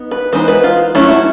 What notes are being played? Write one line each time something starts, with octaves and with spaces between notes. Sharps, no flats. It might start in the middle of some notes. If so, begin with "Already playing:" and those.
Already playing: B3 D#4
B4
E3 G#3 B3 D#4 C5
B4
F4
F#3 A3 C#4 E4
E4